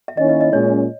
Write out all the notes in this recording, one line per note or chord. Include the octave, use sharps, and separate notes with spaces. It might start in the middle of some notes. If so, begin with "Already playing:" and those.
E5
D#3 A#3 C#4 E4 D#5
D#5
D#5
A#2 G#3 C#4 C#5